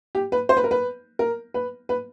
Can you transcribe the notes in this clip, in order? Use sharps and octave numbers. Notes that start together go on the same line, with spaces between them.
G4
B4
C5
B4
A#4
B4
A#4
B4
B4